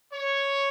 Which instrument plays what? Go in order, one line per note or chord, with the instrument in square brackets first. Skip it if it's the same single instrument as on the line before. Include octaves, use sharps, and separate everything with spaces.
[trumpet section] C#5